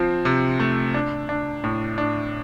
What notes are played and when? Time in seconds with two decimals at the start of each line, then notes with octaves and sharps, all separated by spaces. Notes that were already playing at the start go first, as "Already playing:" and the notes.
Already playing: F3 C4
0.25 C3
0.60 A3
0.94 D4
1.29 D4
1.64 A2
1.98 D4